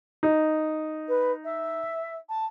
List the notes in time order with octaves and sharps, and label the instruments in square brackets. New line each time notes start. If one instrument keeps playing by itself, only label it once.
[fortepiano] D#4
[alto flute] B4
E5
A5